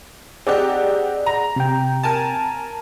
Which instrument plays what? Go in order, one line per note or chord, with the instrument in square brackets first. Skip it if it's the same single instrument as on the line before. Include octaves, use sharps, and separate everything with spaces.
[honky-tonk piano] C4 D#4 G4 [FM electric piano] G#4 D5 F#5
[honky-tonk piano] A#5
[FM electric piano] C3 G5
[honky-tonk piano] A#4 G#5 A5